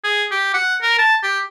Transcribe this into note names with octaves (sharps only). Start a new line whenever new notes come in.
G#4
G4
F#5
A#4
A5
G4